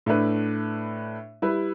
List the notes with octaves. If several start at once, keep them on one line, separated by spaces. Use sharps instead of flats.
A2 A3 D4 B4
G3 E4 B4